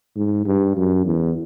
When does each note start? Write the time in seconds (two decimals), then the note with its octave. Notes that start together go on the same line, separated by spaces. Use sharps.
0.16 G#2
0.46 G2
0.77 F#2
1.05 E2